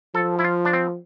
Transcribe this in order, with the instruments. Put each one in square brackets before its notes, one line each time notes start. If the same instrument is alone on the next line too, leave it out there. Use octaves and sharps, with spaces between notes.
[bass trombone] F3 [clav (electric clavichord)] A4
[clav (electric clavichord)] E4
F4
D4
C4